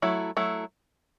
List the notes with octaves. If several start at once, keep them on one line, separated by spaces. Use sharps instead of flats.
F#3 A3 E4
F#3 A3 E4